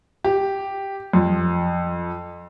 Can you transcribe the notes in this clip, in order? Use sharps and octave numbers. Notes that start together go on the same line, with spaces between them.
G4
F2